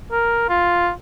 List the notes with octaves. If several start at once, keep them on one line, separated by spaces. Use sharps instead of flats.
A#4
F4